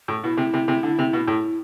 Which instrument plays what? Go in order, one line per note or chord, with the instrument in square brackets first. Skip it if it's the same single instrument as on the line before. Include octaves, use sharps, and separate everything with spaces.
[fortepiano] A2
[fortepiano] B2 [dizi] E4
[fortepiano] C3
C3
C3
D3
C3
B2
A2